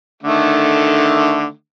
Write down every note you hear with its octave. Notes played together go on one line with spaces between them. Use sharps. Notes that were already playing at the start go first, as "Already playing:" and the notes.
D3 D#3 A3